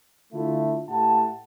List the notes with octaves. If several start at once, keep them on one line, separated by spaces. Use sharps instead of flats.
D3 A3 E4 F4
A2 A3 G4 F#5 A5